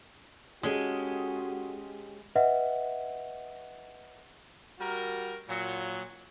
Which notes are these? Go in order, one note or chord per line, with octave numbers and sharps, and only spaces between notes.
G#3 C#4 F#4 G4 A4
B4 D#5 E5 F#5
G3 F#4 A#4
A#2 F#3